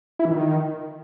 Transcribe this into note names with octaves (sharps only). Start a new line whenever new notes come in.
E4
E3
D#3